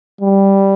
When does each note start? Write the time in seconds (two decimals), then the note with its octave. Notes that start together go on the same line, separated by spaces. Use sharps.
0.21 G3